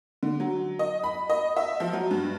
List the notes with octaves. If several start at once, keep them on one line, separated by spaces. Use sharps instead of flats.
D3
F#3
D#5
B5
D#5
E5
F3
F#3
G2